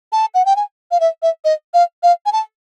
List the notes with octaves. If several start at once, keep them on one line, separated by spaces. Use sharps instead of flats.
A5
F#5
G5
G#5
F5
E5
E5
D#5
F5
F5
G#5
A5